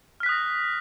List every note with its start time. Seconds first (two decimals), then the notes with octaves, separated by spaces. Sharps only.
0.20 F6
0.23 B6
0.26 F#6
0.29 D#6
0.32 A#6